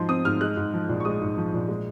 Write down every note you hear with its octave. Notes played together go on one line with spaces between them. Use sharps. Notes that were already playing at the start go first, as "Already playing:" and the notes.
Already playing: G#2 F3 D#4 C6
C4 D#6
G#2 F6
G#3 F#6
G#2
F3
A#1
C#6
G#3 D#6
G#2
F3
A#1
G#3